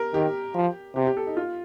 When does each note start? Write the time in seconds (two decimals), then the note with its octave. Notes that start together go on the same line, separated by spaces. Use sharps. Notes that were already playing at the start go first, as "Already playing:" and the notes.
Already playing: G4 A#4
0.14 D#3 G4
0.55 F3
0.96 C3 G4
1.07 G4
1.17 A4
1.27 D#4
1.37 F4